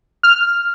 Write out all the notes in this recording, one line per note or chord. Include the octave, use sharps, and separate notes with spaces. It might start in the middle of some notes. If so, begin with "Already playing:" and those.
F6